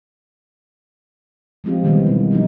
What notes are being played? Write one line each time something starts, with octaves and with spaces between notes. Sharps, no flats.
F3 G#3 C4 F4 G4
B2 D#3 E3 G3 B3
D#4
F3 F#3 D#4